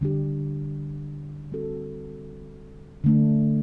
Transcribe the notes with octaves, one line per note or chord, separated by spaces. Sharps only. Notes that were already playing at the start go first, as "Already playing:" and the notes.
D3 G3 D4 G4
G3 C4 F#4 A4
D3 A3 D4